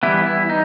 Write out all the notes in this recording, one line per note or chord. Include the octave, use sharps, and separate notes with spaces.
E3 G3 B3 E4
E4
D#4